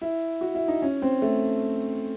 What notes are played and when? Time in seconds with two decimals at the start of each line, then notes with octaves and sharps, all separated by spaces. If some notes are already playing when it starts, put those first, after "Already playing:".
0.02 E4
0.41 F#4
0.55 E4
0.68 D#4
0.82 C#4
1.02 C4
1.22 A3